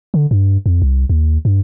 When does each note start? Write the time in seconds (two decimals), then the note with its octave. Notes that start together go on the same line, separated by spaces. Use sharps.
0.14 D3
0.31 G2
0.66 F2
0.82 C2
1.10 D#2
1.45 G2